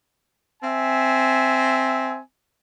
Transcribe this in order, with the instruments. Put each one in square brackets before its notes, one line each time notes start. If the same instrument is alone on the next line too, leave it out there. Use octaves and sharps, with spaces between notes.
[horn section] C4 E5 G#5